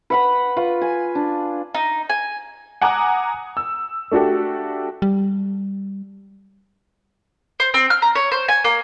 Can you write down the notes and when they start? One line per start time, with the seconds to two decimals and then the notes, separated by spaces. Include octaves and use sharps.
0.10 B4 F#5 B5
0.56 F4 B4 C#6
0.81 G#5
1.15 D4
1.75 D#4
2.09 G#5
2.81 F#5 G#5 A#5 D6 D#6 F#6
3.57 E6
4.11 A3 D4 F#4 G4 A4
5.02 G3
7.60 C5
7.74 C4
7.90 F6
8.02 A#5
8.15 C#5
8.32 C5
8.48 G#5
8.65 A#3